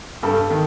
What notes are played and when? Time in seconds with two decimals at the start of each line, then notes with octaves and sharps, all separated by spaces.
0.22 G2 G4 A4
0.50 D#3